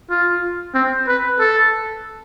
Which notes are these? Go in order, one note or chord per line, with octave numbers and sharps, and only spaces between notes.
F4
C4
B4
A4